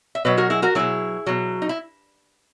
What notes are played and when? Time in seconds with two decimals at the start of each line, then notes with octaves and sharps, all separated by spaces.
0.15 E5
0.25 B2 F#3 B4 D#5
0.37 F#4 A#4
0.50 E4 G#4
0.62 F#4 A#4
0.75 B2 F#3 E4 G#4
1.26 B2 F#3
1.62 D#4
1.69 E4